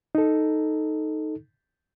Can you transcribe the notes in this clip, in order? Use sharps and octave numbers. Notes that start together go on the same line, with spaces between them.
D#4 A4